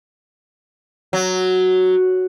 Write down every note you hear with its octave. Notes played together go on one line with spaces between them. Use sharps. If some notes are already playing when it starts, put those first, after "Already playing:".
F#3